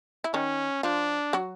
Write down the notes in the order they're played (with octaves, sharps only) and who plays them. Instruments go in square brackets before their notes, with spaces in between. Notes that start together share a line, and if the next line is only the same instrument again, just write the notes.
[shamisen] E4
[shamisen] D#3 D#4 [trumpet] C#4
[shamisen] F3 F4 [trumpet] D4
[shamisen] F#3 F#4